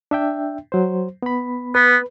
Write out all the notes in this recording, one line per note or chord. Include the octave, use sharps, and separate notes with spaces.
D4 E5 G5
F#3 C5
B3 B5
B3 B4